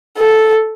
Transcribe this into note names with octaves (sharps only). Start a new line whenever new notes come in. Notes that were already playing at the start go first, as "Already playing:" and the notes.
A4